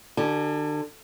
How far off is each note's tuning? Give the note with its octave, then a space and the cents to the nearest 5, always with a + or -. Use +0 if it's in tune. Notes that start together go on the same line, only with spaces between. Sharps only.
D3 +35 G4 -35 A5 -40